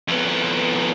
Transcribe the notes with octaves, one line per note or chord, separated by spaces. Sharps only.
F2 B3